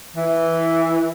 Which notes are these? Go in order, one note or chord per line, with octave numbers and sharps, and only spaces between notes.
E3